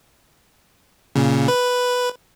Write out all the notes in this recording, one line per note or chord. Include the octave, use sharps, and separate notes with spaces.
A#2 C#3
B4